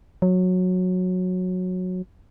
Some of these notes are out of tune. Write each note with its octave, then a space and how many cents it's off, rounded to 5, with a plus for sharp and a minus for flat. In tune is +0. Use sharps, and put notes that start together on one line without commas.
F#3 -15